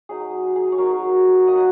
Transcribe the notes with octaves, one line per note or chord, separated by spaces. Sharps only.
F#3 D#4 G#4
G#4
C#5
F#3 D#4 F#4 A#4
F#3 A#3 C#4 D#5
F#5